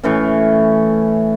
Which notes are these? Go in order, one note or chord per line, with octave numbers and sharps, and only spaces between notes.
A2 E3 C#4